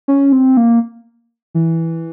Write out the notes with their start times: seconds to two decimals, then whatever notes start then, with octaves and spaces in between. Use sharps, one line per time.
0.08 C#4
0.32 C4
0.57 A#3
1.55 E3